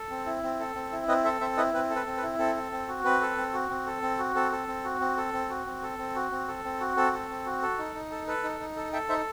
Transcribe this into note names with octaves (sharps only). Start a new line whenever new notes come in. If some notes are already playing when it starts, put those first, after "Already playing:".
Already playing: A4
C4
E4
C4
A4
C4
E4
C4 B4 D#5
A4 C5 E5
C4 C5 E5
E4 B4 D#5
C4 B4
A4
B4
C4
B4
E4
C4 A4
A4
C4
F#4
C4 B4
A4
C4
F#4
C4
A4
C4
F#4
C4 A4
A4
C4
F#4
C4
A4
C4
F#4
C4
A4
C4
F#4
C4
A4
C4
F#4
C4 A4
A4
C4
F#4
A4
D#4
D#4
A4
A4 B4
D#4
D#4
A4
A4 E5 G5
D#4 C5 E5